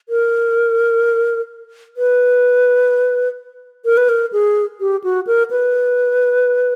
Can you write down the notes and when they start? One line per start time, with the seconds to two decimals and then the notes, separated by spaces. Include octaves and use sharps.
0.09 A#4
1.97 B4
3.85 A#4
3.97 B4
4.09 A#4
4.32 G#4
4.80 G4
5.04 F#4
5.27 A#4
5.51 B4